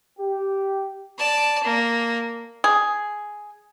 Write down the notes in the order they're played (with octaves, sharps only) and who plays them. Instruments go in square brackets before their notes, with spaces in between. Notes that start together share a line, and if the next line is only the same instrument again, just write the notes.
[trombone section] G4
[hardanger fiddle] D5 A5
A#3
[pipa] G#4